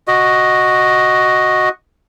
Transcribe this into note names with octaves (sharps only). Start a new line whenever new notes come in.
F#4 D#5